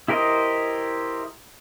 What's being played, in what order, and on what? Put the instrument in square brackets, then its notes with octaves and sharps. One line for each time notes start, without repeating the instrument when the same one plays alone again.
[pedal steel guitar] E4 G4 A#4 C5 D#5